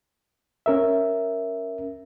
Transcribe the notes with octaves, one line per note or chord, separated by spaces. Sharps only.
C#4 A#4 E5